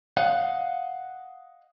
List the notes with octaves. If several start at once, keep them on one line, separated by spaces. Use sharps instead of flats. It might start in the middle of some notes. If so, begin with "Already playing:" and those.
D#5 F5 F#5